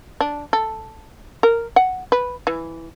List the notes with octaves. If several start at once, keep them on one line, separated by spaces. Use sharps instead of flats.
D4
A4
A#4
F#5
B4
E3